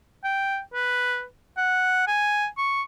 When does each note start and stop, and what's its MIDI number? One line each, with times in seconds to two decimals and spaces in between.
0.24 0.59 79
0.73 1.24 71
1.57 2.03 78
2.07 2.46 80
2.58 2.82 85